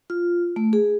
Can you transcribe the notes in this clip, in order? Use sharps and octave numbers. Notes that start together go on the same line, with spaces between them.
F4
A3
G#4